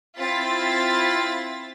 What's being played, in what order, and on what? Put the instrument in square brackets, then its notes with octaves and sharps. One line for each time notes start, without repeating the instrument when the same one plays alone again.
[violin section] C4 E4 F4 A6 B6